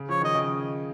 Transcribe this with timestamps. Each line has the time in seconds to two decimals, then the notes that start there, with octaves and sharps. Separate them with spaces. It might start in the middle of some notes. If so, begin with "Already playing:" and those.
Already playing: C#3
0.09 F3 C#5
0.21 D#3 D#5
0.35 C#3